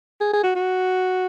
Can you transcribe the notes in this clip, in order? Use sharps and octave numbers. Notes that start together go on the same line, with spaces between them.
G#4
G#4
F#4
F#4